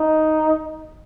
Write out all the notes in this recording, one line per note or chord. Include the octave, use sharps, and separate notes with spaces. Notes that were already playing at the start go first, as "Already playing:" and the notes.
Already playing: D#4